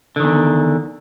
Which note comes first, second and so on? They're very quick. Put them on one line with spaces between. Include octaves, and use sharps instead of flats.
D3 D#3 E2